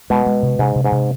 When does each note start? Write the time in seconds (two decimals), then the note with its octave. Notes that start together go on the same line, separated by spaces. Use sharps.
0.10 B2 G#3
0.26 G#3
0.43 C3
0.59 G#2 C3
0.76 C3
0.84 G#2
0.92 C3